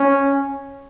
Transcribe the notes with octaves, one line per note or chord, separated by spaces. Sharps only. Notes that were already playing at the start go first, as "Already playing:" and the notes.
Already playing: C#4